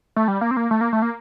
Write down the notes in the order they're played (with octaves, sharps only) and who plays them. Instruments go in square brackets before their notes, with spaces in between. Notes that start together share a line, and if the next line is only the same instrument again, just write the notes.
[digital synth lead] A3
G3
A#3
C4
A#3
A3
A#3
A3
A#3